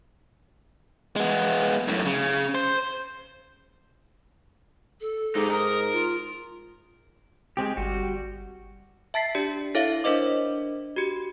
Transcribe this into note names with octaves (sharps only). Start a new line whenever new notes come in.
G#3 B3
F#2 A2
C#3
C5
A4
G#2 D#4 G4
A#4 D#6
F4
G#3 C4 G4
G1 G3 F#4
E5 A5 A6 B6 C7
D4 G4 D5 B6
E4 A4 C#5 E5 F5
D4 A#4 C5 D#5 D6
F#4 G4